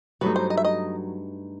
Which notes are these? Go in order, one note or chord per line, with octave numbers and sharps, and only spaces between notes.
G2 F#3 A3 D#4 B4
C5
D#5
E5
D#5